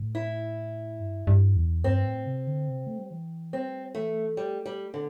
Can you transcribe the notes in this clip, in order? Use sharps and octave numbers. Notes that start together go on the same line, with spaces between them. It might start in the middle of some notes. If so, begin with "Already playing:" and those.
Already playing: A2
E4
G2
G2
E2
G2 C4
A2
C3
D3
C3
A3
G3
E3
G3 C4
E3 A3
G3 A3
G3
D3